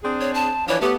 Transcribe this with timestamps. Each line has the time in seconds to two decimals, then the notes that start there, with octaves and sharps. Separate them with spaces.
0.04 C4 D4 G#4
0.21 C#5
0.34 A5
0.68 E3 F3 D4 C#5
0.81 A3 B3 G4